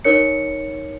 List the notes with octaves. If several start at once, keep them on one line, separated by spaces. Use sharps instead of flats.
D#4 A#4 C#5 C#7